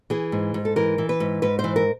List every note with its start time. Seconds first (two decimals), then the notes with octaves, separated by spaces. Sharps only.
0.10 E3 G#4
0.32 G#2
0.54 G#2
0.65 A4
0.76 E3 A#4
0.98 E3
1.09 B4
1.20 G#2
1.42 G#2 B4
1.59 C5
1.64 E3
1.76 A#4